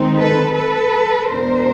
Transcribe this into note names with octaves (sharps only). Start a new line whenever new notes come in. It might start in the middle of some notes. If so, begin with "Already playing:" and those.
Already playing: D#3 G#3 C4 D#4
A4 B4
A4 B4
E2 B2 G#3 B3 D4 A#4 C5